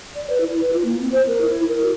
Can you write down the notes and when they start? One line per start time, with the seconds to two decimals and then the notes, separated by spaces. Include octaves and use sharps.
0.16 D5
0.30 B4
0.41 E4
0.61 B4
0.73 F4
0.85 A#3
1.00 C4
1.12 C5
1.27 A#4
1.41 E4
1.68 A#4
1.83 F#4